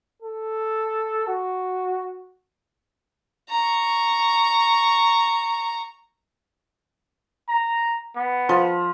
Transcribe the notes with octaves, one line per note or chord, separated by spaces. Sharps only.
A4
F#4
A#5 C#6
A#5
B3
F3